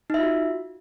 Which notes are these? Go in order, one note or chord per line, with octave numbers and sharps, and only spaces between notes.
D#4 F4 F#4 E5